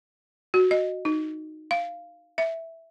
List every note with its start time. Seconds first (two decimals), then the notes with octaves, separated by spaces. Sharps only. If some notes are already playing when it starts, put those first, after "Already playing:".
0.54 F#4
0.71 D#5
1.05 D#4
1.71 F5
2.38 E5